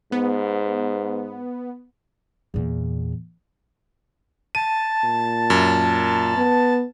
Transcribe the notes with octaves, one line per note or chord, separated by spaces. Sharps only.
G#2 B3
E2 A#2
A5 D#7
A#2
F#2
B3